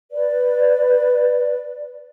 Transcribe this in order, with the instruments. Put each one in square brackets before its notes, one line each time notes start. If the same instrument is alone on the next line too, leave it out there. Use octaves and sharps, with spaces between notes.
[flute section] B4 D5